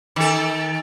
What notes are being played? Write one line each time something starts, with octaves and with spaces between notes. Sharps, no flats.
D#3 A4